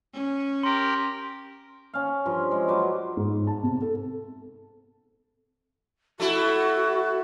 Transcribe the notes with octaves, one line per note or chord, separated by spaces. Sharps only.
C#4
G4 A#4 C6
C#4 F5
G2 F3
G#3
F#3 B4 C5 D6
G#2
A5
C3
A4
A3 E4 F#4